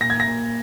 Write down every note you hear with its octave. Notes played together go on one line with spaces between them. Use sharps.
A#2 A#6
G#6
A#6
A#2